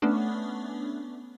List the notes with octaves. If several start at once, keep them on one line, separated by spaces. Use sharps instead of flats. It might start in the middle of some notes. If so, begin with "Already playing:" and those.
A3 B3 C#4 D4